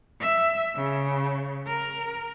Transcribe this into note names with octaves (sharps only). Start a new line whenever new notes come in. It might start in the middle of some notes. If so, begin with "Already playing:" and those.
E5
C#3
A#4